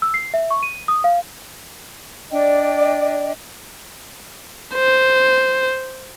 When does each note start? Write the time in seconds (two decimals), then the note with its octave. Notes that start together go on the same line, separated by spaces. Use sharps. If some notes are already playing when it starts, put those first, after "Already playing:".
0.02 E6
0.14 C7
0.34 E5
0.51 C#6
0.63 D#7
0.88 D#6
1.04 F5
2.32 D4 D5 D#5 G5
4.75 C5